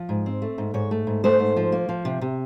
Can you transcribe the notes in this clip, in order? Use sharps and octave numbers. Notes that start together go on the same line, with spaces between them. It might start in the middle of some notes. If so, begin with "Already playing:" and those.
Already playing: F3
G#2
C4
A3
G#2
G#2 C#5
A3
G#2
A3 C5
G#2
F3
A#3
F3
C3
C3